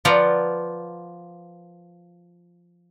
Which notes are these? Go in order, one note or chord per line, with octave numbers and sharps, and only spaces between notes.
F3 F4 B4 D5 F#5 A#5